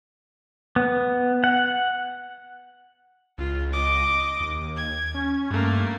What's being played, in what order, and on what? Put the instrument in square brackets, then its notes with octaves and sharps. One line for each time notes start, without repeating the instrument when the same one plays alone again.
[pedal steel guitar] B3
F#5
[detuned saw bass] C#2 [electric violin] F4
[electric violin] D#5 D6
[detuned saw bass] D#2
[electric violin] G#6
[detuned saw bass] C#4
[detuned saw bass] G2 [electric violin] A3 A#3